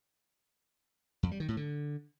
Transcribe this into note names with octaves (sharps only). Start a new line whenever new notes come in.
F2
G3
D#3
A2
D3